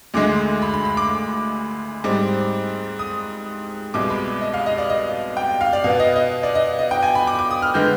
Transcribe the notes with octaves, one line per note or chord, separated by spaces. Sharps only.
D2 D3 G#3 D6
B5
B5
B5
D6
G#2 G3 C4 D6
D#6
C2 B2 G#3 D6
B5
D#5
F5
D#5
D5
D#5
G5
F5
D5
B2 B3 F5
D#5
D#5
D5
D#5
D#5
G5
G#5
B5
D6
D6
D#6
F6
D3 G#3 B3 G6